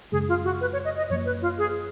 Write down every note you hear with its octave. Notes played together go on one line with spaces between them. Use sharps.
F#2 C#3 G#3 G#4
F4
F#4
B4
C#5
D#5
D#5
F#2 F3 A#3 C#5
B4
F4
G#4